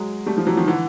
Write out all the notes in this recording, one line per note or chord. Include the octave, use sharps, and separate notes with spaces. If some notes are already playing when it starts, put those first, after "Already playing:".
Already playing: F#3 G#3
G3 A3
F3 G3
E3 F#3
D#3 F3
D3 E3